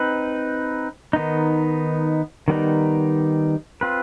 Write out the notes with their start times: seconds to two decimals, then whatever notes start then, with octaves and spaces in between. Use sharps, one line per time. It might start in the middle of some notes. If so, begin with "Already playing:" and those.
Already playing: C4 D#4 B4
1.13 D#3 B3 D#4
2.48 D#3 G3 B3 D#4
3.81 C4 F4 B4